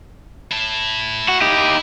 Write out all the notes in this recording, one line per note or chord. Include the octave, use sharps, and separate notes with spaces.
E4 A5
F#4
D#4 G4